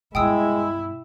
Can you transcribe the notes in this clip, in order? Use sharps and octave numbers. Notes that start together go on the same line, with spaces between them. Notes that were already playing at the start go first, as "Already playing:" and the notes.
G2 B2 G#3 E4 G5 D#6 E6